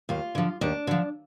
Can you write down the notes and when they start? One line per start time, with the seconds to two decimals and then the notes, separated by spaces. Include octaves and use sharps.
0.09 D#2 F4
0.35 D3 F3
0.61 D#2 D4
0.87 D3 F3